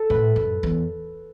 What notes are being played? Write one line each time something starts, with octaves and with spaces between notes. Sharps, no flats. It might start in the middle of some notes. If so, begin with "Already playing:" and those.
Already playing: A4
A2 B4
F#2
E2